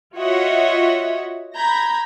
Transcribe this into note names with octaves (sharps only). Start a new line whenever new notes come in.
F4 F#4 C#5 D#5 E5 F#5
A#5 B5 G6 G#6 A#6